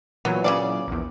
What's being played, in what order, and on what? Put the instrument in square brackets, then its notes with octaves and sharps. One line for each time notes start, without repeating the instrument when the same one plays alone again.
[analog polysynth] A#2 E3 F#3 [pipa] B3
[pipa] C#3 A#3 D5
[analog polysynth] A#1 E2